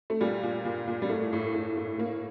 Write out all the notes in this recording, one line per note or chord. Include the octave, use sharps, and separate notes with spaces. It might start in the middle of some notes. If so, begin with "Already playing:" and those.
A3
A#2 G3
A#2
A#2
A#2
G3
A2 A3
A2
A2
A2
A2 A#3